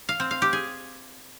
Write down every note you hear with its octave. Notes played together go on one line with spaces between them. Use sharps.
F5
C4
F5
G4
G#4